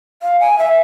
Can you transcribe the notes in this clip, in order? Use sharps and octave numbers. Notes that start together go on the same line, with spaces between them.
F5
G#5
E5